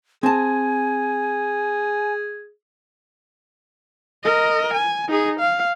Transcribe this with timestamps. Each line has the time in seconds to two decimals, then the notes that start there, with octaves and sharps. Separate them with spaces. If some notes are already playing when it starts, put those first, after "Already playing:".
0.23 C4 G#4 G#5 A5
4.24 A#4 D#5
4.73 G#5
5.08 D#4 G#4
5.40 F5